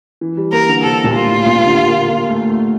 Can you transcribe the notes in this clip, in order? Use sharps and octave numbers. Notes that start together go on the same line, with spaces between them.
E3
G3
A#3 A#4
D3
C3 A4
A#2
F4
A2
A#2
C3
D3
A#3
A#3
A3
A3